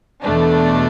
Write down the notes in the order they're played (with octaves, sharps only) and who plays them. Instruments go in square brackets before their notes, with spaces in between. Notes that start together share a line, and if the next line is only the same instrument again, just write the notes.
[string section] E2 B2 A3 D4